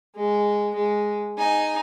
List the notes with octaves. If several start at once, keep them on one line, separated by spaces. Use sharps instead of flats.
G#3
G#3
D#4 G#5